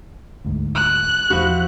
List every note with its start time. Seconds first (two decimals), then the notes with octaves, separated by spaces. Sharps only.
0.44 D2 G#2
0.75 F#6
1.30 E1 F3 E4 F#4